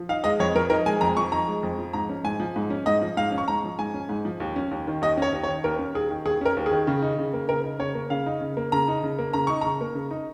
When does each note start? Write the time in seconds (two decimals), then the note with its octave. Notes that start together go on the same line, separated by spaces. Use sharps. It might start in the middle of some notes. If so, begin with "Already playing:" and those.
Already playing: F3
0.09 D#4 F5
0.24 G#3 D#5
0.39 F2 C#5
0.55 F3 A#4
0.70 D#4 A#4
0.86 G#3 G#5
1.01 F2 A#5
1.16 F3 C#6
1.32 D#4 A#5
1.48 G#3
1.63 F2
1.78 F3
1.93 G#2 A#5
2.09 C#4
2.24 G#2 G#5
2.40 F3
2.56 G#2
2.70 C#4
2.86 G#2 D#5
3.02 F3
3.17 G#2 F5
3.32 C#4
3.38 C#6
3.48 G#2 A#5
3.64 F3
3.79 G#2 G#5
3.94 C#4
4.09 G#2
4.25 F3
4.40 D#2
4.56 C#4
4.71 D#2
4.87 D#3
5.02 D#2 D#5
5.17 C#4 C#5
5.32 D#2
5.43 C#5
5.48 D#3
5.64 D#2 A#4
5.79 C#4
5.94 D#2 G#4
6.10 D#3
6.25 D#2 G#4
6.41 C#4 A#4
6.57 D#2
6.66 G#4
6.71 D#3
6.87 C#3
7.02 D#4
7.19 C#3
7.33 A#3
7.49 C#3 A#4
7.64 D#4
7.79 C#3 C#5
7.95 A#3
8.10 C#3 F5
8.26 D#4
8.41 C#3
8.57 A#3
8.72 C#3 A#5
8.88 D#4
9.03 C#3
9.19 A#3
9.33 C#3 A#5
9.47 D#4 C#6
9.61 C#3 A#5
9.81 A#3
9.95 C#3
10.11 D#4